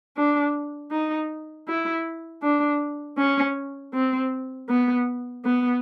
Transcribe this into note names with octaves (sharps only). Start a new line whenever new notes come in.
D4
D#4
E4
D4
C#4
C4
B3
B3